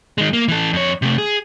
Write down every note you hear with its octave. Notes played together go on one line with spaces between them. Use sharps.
D#3 G#3
A#3
E3 A4
F2 C#5
C3 A3
G#4